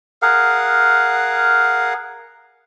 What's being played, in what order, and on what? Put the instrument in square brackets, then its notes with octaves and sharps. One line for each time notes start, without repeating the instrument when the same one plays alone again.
[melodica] G#4 A#4 F5 F#5